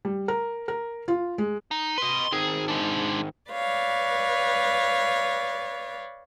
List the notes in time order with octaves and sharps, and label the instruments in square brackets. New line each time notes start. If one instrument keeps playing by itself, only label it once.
[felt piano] G3
A#4
A#4
F4
G#3
[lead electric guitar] D#4
[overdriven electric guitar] B4 D#5 [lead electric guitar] C6
[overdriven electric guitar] D#3 C4 [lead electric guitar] G#4
[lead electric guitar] G#3 D4
[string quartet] B4 C#5 D5 F5